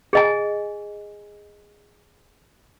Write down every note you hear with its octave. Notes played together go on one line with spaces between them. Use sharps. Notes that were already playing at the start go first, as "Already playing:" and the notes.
G#4 D#5 G#5